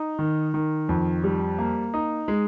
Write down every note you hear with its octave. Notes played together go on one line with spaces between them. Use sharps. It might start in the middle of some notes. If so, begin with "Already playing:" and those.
Already playing: D#4
D#3
D#3
F2
G3
A#3
D#4
G#3